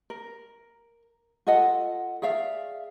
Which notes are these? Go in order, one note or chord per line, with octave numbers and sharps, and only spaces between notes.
A#4
F4 A4 D#5 F#5
G#4 D5 E5 F5